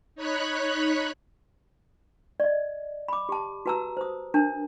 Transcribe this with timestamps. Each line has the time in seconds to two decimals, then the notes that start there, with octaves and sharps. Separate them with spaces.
0.15 D#4 C#5 B5 F#6
2.40 D5 D#5
3.08 B5 D6
3.29 G4 A5
3.66 F#4 B4 A5 A#5 E6
3.97 C5 D#6
4.34 D4 A#4 A5